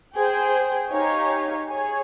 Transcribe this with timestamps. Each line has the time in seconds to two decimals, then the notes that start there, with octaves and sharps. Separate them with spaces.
0.16 G#4 C5 G5
0.91 D#4 G4 C#5 F5 G#5
1.67 G#4 C#5 G#5